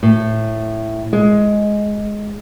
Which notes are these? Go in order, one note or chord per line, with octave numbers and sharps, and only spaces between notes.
A2
G#3